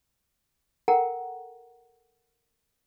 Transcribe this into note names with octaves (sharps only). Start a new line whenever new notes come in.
A4 A#4 F#5 G5 A#5